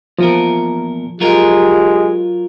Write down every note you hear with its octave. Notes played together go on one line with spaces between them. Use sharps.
E2 A#2 F3 A#4
F#3 G#3 F4 G4 A#4